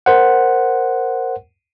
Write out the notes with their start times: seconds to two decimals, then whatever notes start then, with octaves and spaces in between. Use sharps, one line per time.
0.06 A#4 C5 F#5